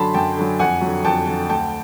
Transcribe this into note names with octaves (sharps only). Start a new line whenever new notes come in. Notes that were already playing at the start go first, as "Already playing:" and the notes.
Already playing: F#2 D3 F#3 A5 B5 C6
F#2 G5 A5
D3 F#3
F2 F#5 G#5
D3 F#3
F2 G5 A5
D3 F#3
D2 G5 A5